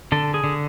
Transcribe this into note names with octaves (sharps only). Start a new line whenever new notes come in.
D3 A4
G#4
D3